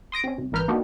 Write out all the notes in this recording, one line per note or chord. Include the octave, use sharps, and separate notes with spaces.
C6 D#6 A#6 D7
C4 C#4
C2
G#1 E3 A#4 B4 F6 G6
A#3 B3 D4 D#4 F#4 G4